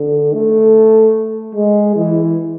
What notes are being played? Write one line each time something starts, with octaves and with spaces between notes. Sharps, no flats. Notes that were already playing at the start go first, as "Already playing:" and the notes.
Already playing: D3
A3
G#3
E3